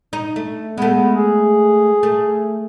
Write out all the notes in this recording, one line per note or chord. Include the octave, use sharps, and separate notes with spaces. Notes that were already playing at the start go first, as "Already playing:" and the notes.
D#4
A3
G#3 A3 B3
G#4
A3